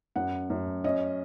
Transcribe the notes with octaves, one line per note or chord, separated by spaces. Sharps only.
F#2 F#5
F#2
C#4 D#5